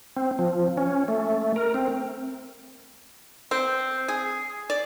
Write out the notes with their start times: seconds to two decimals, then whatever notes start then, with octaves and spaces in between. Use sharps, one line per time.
0.16 C4
0.39 F3
0.77 C#4
1.08 A3
1.56 A#4
1.74 C4
3.51 C4
4.08 G#4
4.70 D5